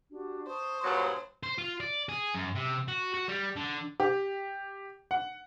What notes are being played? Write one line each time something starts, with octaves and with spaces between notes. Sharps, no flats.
D4 F#4 G4
C5 A5 C#6 D#6
G2 A#2 F#3
C5
F4
D5
G#4
F#2
C3
F#4
F#4
G3
D3
G4
F#5